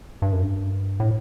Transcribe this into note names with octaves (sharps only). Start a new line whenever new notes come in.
G2
F#2
G2
A2